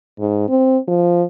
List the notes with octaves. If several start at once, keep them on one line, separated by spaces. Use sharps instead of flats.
G#2
C4
F3